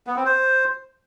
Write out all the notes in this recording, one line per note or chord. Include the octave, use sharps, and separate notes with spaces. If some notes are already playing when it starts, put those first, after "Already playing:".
B3
C4
C5